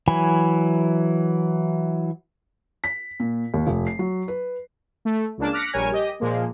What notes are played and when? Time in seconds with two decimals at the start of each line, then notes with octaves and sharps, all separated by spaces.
0.08 E3 F#3 G#5 B5
2.84 B6
3.20 A#2
3.54 D#2
3.67 F1
3.87 C7
3.99 F#3
4.28 B4
5.05 A3
5.38 C#2 C#3 A#3 D4 A5
5.52 D6 F6 F#6 A#6 B6 C#7
5.73 A#1 G3 A#4 C#5 G#5 G#6
5.92 G4 D#5
6.20 A#2 F3 G#3 A#3